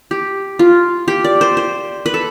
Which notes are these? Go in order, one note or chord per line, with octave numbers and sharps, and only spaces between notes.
G4
F4
G4
D5
C5
C5
B4
A4